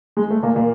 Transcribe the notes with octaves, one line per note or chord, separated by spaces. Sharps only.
G#3
A3
A#2 A#3
A#2 A#3